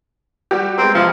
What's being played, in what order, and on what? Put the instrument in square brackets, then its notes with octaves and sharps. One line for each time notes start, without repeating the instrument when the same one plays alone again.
[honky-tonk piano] G3 F#4 G4
[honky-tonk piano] G#3 B3 A#4 [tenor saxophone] C4
[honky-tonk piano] F2 C3 E3 [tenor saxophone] F3